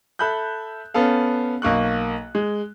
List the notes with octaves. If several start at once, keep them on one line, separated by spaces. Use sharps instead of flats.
A4 E5 B5 F#6 G6
B3 C#4 A4 F5
B1 A#3 C#6 F#6
G#3